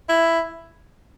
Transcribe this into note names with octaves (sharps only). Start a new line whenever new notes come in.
E4